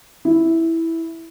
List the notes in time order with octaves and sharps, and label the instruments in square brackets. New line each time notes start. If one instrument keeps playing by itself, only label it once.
[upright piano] E4